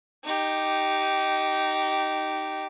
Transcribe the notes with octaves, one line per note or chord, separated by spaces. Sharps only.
D#4 G4